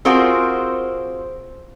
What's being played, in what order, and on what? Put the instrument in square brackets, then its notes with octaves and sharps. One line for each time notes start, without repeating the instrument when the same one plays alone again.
[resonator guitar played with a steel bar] C4 F4 F#4 G#4 A#4 C5